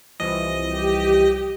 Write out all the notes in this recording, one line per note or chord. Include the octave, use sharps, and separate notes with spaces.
C2 E3 F3 D#5
G4